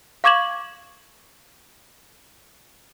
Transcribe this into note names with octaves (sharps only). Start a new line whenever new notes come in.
F5 C#6 D6 G#6 E7 F#7